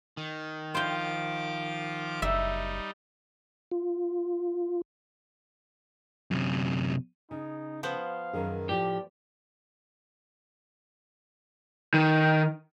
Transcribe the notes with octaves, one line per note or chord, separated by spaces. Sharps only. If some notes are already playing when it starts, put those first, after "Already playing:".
D#3
F3 F4 C5 G5 D6
F#1 G3 D#4 E5
F4
F#2 C3
C#3 D#4
F3 B3 C5 F5
F#2 D#3 G#4
A2 F3 G4 D5
D#3